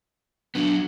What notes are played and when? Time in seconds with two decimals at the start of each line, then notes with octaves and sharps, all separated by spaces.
0.55 F#3 B3 D4